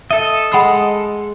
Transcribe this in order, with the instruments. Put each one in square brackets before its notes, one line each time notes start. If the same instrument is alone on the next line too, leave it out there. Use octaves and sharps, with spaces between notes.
[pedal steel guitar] A4 D#5 [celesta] E5
[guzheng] G#3 C6 [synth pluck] F#5 B5 D#6